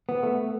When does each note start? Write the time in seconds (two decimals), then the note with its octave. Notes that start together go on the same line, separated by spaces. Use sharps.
0.09 B3
0.23 A3